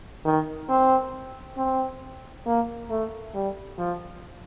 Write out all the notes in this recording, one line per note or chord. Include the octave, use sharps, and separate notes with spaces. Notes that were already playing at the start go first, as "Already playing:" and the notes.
D#3
C4
C4
A#3
A3
G3
F3